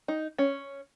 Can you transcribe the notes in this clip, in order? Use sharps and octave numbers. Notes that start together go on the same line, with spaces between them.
D#4
C#4